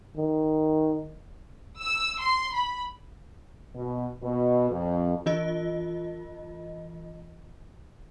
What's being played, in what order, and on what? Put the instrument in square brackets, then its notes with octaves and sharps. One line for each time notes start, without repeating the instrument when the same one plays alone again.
[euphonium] D#3
[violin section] E6
C6
B5
[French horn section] B2
B2
F2
[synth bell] E3 F4 D#5